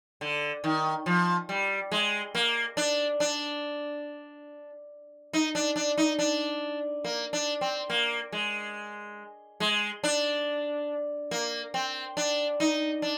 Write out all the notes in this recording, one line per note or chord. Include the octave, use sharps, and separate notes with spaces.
D3
D#3
F3
G3
G#3
A#3
D4
D4
D#4
D4
D4
D#4
D4
A#3
D4
C4
A#3
G#3
G#3
D4
A#3
C4
D4
D#4
D4